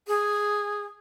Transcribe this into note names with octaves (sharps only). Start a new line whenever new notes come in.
G#4